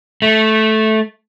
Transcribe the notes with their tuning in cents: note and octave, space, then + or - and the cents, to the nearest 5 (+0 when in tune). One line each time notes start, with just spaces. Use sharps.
A3 -10